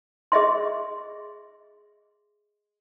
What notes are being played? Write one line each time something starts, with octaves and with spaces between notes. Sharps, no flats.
G#4 D#5 E5 C6